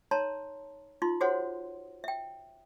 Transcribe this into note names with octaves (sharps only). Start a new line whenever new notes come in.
D#4 C#5 A5 A#5 C6
D#4 F4 C6
F#4 G#4 C5 C#5 F#5 C6
E5 G5